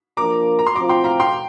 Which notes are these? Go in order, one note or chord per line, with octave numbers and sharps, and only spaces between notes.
F3 A#3 D4 A#4 A#5 D6
A#5
C6
F3 C4 F4 C5 A#5 D6
G5 C6
F5 A#5
G5 C6